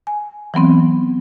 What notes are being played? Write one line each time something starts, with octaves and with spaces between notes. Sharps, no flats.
G#5
E3 F#3 B3 C4